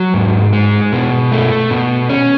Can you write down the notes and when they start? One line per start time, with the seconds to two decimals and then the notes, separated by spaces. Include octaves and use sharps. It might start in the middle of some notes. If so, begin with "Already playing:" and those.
Already playing: F#3
0.14 G#2
0.53 G#3
0.93 B2
1.32 A3
1.71 B2
2.09 C#4